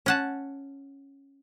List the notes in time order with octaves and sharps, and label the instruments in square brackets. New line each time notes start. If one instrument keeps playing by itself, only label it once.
[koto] C#4 F#5 A5